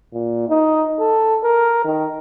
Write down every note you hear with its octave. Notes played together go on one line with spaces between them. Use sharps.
A#2
D#4
A4
A#4
D#3